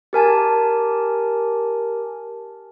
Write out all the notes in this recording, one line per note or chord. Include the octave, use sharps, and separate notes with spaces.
G4 A#4 G#5 A5